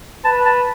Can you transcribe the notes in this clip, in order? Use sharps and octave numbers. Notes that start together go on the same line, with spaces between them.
B4 A5
A5